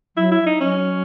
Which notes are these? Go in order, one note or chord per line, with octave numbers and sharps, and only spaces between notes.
F#3 E4
E4
D#4
F#3 C#4